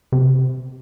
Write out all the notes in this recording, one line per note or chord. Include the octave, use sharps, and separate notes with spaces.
C3